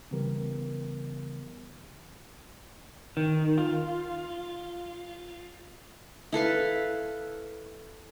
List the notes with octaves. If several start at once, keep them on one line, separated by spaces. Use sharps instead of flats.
C#3 E3 G3 B3 G4 A#4
D#3
F4
E4 A4 B4 F5